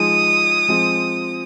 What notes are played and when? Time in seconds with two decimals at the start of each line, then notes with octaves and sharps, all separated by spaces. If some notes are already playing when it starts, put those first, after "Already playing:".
Already playing: F3 G#3 D#4 D#6
0.68 F3 G#3 C4